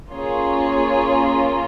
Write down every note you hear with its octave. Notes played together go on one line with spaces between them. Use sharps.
A#3 C#4 F4 G#4 C#5